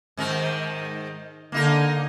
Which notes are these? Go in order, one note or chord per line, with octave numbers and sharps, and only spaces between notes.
G#2 D#3 A#4
D3 A#3 D#4 A#4